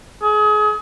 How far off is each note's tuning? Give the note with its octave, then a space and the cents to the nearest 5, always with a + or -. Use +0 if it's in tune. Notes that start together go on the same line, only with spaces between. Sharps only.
G#4 +30